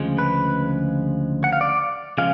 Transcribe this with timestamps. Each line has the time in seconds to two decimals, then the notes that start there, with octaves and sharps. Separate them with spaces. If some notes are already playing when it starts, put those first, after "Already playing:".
Already playing: D2 C#3 F3 G#3
0.18 B4
1.44 F#5
1.53 F5
1.61 D5
2.18 C#3 F3 G#3 F5